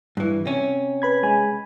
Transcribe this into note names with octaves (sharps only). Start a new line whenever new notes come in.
G2 E3
C3 C#4
B4 B5 G#6
G#3 G#5 B5